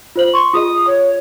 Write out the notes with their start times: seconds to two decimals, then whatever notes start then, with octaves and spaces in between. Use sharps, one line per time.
0.16 F4 C5 F#7
0.34 C6 C#6
0.54 F4 G#4 D#5 D#6
0.87 C#5